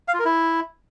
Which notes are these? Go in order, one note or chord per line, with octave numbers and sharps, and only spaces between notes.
F5
F4
A#4
E4